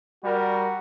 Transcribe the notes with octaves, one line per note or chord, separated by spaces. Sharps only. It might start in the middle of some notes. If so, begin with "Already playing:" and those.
G3 F#4 A#4